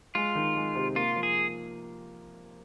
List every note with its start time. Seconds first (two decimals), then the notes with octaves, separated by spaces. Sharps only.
0.15 G#3 F4
0.35 D#3
0.56 G#3
0.75 C3
0.95 A#3 F4
1.16 F3
1.23 G#4